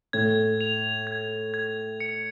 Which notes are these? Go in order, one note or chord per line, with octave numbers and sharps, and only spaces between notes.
A2 G#6
F7
G#6
G#6
C#7